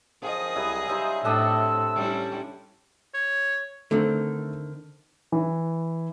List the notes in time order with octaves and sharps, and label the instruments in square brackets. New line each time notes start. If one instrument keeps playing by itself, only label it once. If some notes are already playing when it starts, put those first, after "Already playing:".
[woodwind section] F#2 D#3 F3 [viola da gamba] G#4 D#5
[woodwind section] C2 [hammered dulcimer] F#3 E4
[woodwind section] C#3 G3 [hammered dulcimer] D#4 C5 E5
[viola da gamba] A2 [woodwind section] C3 E5 E6 [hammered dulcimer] D4 A4 D#5
[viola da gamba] G3 C#4 E4
[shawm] C#5
[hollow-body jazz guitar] D3 D#3 C4 [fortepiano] A3
[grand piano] E3